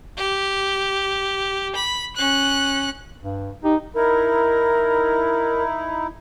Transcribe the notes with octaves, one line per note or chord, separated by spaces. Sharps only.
G4
B5
C#4 F#6
G2
D#4 G4
D#4 E4 A#4